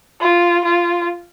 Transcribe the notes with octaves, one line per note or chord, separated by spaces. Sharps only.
F4
F4